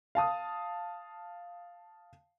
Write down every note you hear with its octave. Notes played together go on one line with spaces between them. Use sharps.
F5 A5 D#6